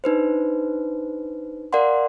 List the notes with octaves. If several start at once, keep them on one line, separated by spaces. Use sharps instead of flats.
D4 D#4 B4 C5
A#4 D5 F5 F#5 C6